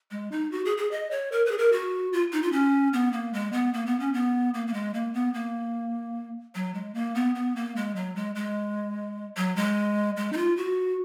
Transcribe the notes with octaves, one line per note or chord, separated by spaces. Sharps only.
G#3
D#4
F#4
G#4
G#4
D#5
C#5
A#4
B4
G#4
A#4
F#4
F4
D#4
F4
C#4
B3
A#3
G#3
B3
A#3
B3
C#4
B3
A#3
A#3
G#3
A#3
B3
A#3
F#3
G#3
A#3
B3
B3
A#3
G#3
F#3
G#3
G#3
F#3
G#3
G#3
D#4
F4
F#4